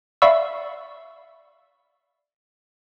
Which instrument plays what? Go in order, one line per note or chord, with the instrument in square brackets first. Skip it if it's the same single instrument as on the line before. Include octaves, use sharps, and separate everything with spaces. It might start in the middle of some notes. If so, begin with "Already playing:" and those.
[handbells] D5 E5 F5 B5 C#6 E6